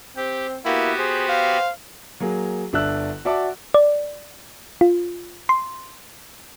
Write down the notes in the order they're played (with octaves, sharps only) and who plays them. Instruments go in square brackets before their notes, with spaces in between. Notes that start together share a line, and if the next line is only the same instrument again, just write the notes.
[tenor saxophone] C4 [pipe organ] G4
[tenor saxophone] A#3 [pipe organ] B3 F#4 G4 [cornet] E4
[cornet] G#4 [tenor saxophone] C5
[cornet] F5
[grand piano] F#3 A#3 G#4
G1 D4 E5 E6 F#6
F#4 D5 E5 F#5 A5 D6
[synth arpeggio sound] D5
F4
C6